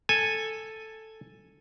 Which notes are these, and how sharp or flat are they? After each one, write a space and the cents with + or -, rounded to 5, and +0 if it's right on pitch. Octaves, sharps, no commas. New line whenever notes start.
A4 +0 G#5 +0